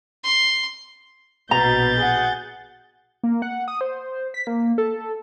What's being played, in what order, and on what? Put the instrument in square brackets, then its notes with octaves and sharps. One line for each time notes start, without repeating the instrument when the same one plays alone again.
[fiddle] C6
[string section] A#1 B2 [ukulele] A#5 [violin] G6 A6
[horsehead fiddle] G#4 F#5
[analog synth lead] A#3
F#5
D#6
C5
B6
A#3
A4